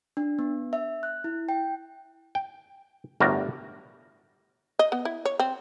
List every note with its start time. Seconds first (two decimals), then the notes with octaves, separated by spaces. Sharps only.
0.17 D4
0.39 B3
0.73 E5
1.03 F#6
1.24 E4
1.49 G5
2.35 G5
3.20 G1 A2 G3 F#4 A#4
4.79 D#5
4.92 B3
5.05 E4
5.25 C#5
5.40 C4